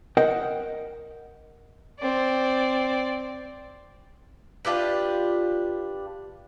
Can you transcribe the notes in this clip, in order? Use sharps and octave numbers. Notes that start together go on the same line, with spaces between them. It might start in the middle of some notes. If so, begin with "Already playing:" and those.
A#4 D#5 F#5 G5
C4 D5
D4 F4 G4 B4